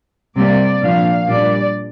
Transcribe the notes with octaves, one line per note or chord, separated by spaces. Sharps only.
C3 G3 A#3 D5
A#2 F3 D4 F5
A#2 G3 D4 D5